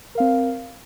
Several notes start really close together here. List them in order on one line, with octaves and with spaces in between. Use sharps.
A#4 F5 C4